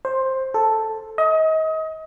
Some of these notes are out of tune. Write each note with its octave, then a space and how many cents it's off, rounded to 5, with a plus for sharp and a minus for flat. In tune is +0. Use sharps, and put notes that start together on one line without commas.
C5 +10
A4 +0
D#5 +30